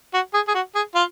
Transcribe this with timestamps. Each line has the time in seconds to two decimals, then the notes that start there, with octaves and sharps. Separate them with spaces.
0.14 F#4
0.34 G#4
0.48 G#4
0.55 F#4
0.75 G#4
0.95 F4